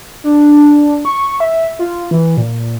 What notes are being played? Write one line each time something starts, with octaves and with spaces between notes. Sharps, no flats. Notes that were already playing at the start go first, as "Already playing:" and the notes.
D4
C#6
E5
F4
E3
A#2